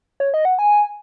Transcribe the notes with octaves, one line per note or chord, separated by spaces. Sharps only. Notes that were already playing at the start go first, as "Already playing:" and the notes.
C#5
D#5
F#5
G#5